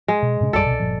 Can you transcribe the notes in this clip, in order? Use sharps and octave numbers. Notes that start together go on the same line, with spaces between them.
G#3
B2
A2 C3 C#4
A#1 F#2 G3 A4 D5
C2 B2
G1 A#2 F3